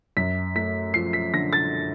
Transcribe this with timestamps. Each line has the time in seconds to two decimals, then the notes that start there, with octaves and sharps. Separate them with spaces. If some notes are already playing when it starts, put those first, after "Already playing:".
0.17 F#2 B6
0.55 A3 B6
0.94 F3 C7
1.13 B6
1.34 D3 A#6
1.53 A6